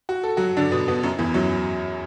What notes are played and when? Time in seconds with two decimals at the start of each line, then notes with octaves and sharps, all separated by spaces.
0.09 F#4
0.23 A4
0.37 F#3 F#4
0.57 D3 D4
0.72 B2 B3
0.88 B2 B3
1.03 F#2 F#3
1.18 E2 E3
1.34 F#2 F#3